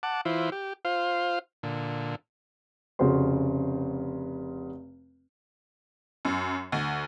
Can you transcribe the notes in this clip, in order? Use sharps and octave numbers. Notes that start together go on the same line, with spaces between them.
F#5 A5 D6
E3 E4 F4 C5
G4
F4 C5 F5
A#2 D3
F1 C#3 C#4 F#4 C5 C6
F#2
D2